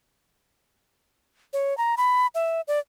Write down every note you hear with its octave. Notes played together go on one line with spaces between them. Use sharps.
C#5
A#5
B5
E5
D5